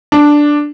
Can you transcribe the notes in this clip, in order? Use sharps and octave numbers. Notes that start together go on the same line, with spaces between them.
D4